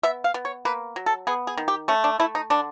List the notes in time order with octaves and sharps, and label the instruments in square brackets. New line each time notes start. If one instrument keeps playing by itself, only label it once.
[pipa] B3 E5
F5
B3
C#5
A#3 B4
F#3
A4
B3 G#4
G#4
D#3
G4
A3 C#4
D4
A3 E4
D#4
D3 D4